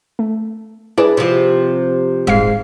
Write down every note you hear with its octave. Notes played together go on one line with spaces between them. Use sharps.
A3
D4 E4 G#4 B4
C3 F3
D#1 G#1 G#2 F5 C7